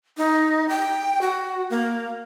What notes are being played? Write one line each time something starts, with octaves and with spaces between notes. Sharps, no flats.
D#4
G5
F#4
A#3